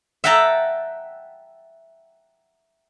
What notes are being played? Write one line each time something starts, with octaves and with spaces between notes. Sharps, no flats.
E5 F#5 G5 A5 A#5